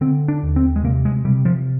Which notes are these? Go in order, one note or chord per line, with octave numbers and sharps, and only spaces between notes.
D3 C4
D4
D#2
C4
G#3
C3 A#3
G#3
C3 G3
F3